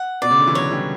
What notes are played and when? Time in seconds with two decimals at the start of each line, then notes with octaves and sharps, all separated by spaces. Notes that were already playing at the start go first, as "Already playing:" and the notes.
Already playing: F#5
0.22 B2 D5
0.31 C#3
0.39 D3
0.48 E3
0.55 D3 F#3 C#5
0.71 E3 G3